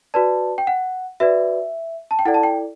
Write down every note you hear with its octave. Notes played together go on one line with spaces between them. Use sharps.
F#4 B4 D5 A5
G5
F#5
F#4 B4 D5 E5
A5
G5
E4 A4 D5 F#5
A5
G5